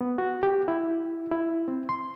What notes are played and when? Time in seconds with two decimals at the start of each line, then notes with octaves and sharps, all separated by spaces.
0.01 B3
0.18 F#4
0.43 G4
0.68 E4
1.32 E4
1.68 C4
1.89 C6